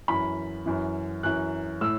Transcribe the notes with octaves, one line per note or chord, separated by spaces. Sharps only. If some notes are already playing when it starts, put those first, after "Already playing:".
F#2 E3 B5
F#2 E3
F#2 E3 F#6
A2 E6